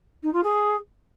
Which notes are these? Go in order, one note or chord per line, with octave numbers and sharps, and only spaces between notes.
D#4
F4
G#4